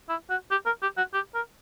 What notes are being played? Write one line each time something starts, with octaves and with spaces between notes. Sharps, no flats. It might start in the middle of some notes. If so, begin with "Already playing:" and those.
E4
F#4
G4
A#4
G4
F#4
G4
A#4